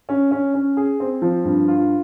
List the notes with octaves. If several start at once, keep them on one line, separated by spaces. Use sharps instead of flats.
C#4
C#4
C#4
G#4
C4
F3
G2
F4